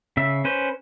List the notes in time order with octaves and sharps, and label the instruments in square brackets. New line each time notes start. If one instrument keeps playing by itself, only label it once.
[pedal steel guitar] C#3 E5
C#4 B4 C5